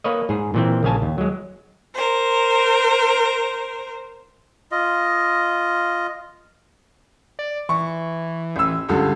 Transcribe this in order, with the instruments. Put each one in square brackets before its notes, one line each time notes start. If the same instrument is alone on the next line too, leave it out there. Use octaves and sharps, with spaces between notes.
[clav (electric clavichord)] A#3 B4 C#5 D#5
G#2 G#4
A#2 E3 C4
A#1 C#3 F5 G#5 A5
D#2
F#3 G#3
[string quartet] A#4 C5
[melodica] F4 D#5
[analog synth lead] D5
[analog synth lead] E3 [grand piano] C#6
[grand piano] A1 E6
C#2 G2 D3